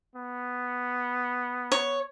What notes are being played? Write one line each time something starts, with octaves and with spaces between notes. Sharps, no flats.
B3
C#5